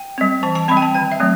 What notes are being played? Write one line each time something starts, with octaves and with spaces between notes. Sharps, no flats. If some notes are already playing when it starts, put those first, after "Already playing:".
Already playing: G5
G3 C4
E3 A5
A5
G3 C4 B5
G5
A5
D#3 G5
E5
F#3 A3 C4